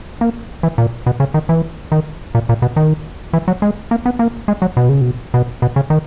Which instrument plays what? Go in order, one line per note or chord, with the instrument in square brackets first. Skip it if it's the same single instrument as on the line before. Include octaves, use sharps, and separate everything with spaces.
[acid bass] A#3
E3
A#2
B2
C#3
D#3
E3
D#3
A#2
A#2
B2
D#3
E3
F#3
G#3
A#3
B3
A#3
G#3
F#3
B2
C#3
B2
B2
B2
C#3
D#3